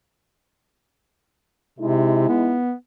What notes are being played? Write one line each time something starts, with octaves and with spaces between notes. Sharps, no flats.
C3 G#3 D#4 E4
B3